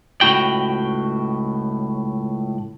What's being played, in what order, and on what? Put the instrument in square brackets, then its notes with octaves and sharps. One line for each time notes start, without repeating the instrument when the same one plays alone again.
[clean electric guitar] C#2 A2 F#4 G5